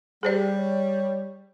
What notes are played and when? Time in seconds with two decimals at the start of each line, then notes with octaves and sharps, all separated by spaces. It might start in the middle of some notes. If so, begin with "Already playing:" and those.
0.23 G3 G4 G#4 C5 D5
0.58 C#5